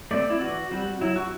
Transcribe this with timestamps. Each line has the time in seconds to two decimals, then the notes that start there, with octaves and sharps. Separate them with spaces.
0.11 A3 C4 D5
0.30 E4
0.40 E3 F#4
0.71 G3 C4 F#4
1.01 F#3 E4
1.16 F#4